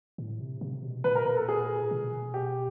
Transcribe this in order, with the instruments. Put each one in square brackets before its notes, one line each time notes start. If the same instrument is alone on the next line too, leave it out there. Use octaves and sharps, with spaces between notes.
[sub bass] A2
C3
C3
B2
[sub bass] A#2 [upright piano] B4
[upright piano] A#4
A#4
A4
G#4
[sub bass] B2
[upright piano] G4